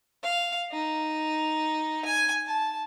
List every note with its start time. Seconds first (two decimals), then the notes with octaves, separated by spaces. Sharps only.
0.23 F5
0.72 D#4
2.05 G#5
2.46 A5